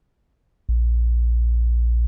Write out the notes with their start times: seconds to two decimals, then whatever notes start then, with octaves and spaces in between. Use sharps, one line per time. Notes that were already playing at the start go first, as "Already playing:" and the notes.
0.69 A#1